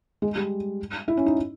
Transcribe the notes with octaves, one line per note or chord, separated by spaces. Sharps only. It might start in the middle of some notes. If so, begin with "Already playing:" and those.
G#3
G3
E4
C#4
D#4